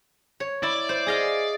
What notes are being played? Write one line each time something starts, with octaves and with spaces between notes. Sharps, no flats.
C#5
E4 D5
C5
G#4 D#5 F5